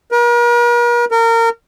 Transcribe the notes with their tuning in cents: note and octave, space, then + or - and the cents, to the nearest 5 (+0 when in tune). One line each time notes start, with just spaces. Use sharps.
A#4 +45
A#4 -25